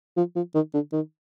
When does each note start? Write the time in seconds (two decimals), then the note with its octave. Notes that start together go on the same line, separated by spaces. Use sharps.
0.17 F3
0.36 F3
0.54 D#3
0.74 D3
0.92 D#3